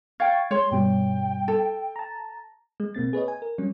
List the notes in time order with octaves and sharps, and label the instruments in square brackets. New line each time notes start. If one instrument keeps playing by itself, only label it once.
[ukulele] F5 G5 [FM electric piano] C#6 G#6 A6
[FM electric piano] G#3 [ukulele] C#5 [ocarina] C6
[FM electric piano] G2 B2 G3 [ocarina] G5
[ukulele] A4
[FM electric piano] A5 A#5
G#3
B2 A#3 C4 A6
G#4 B4 C#5 D#5
G#5
A#4
F#3 G3 C#4